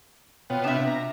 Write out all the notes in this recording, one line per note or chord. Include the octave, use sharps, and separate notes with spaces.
B2 B3 F4 C#5 G5
C3 D4 E5 E7
A#5